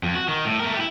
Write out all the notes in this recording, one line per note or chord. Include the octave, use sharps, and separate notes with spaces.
F2
F#4
D#3
A2
A3 A#4
E4 G4